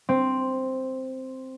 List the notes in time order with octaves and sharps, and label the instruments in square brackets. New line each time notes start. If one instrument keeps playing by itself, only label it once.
[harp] C4